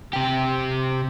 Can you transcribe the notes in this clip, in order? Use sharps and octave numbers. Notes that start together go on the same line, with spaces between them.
C3 G4